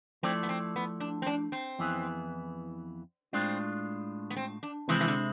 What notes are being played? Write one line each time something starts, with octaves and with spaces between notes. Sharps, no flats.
F3 A3 C4 E4 A4 D5
B3
C4
B3
D4
C4
D4
C4
F2 E3 B3 E4 G#4
A2 G#3 C4 D4 F4
B3
C4
D4
C3 E3 G#3 C4 E4
E3
D3